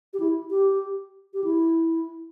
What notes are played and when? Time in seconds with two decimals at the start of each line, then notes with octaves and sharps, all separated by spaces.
0.13 G4
0.20 E4
0.50 G4
1.34 G4
1.44 E4